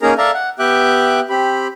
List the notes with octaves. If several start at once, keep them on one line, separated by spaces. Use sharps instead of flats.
A#3 C#4 D#4 G#4 A#4 A#5
A4 D5 E5 F5 A5 A#5
F#5
B3 G4 E5 G5 D6 F#6
C4 G4 B5